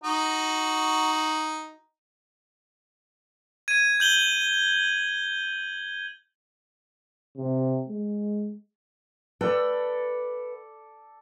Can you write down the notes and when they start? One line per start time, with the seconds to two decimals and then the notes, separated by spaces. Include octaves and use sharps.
0.04 D#4 F#4
3.68 G#6 D#7
4.00 G6 F#7 G7
7.37 C3
7.88 G#3
9.41 A4 B4 D5 G5